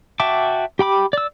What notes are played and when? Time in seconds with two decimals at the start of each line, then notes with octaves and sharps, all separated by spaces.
0.20 F#4 E5 G5 A5 D6
0.79 G4 G5 B5 D6
1.13 D5 E6